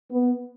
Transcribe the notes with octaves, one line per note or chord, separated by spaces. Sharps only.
B3